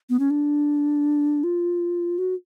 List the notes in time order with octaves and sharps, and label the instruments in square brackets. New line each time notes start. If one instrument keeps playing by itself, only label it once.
[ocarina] B3
C#4
D4
F4
F#4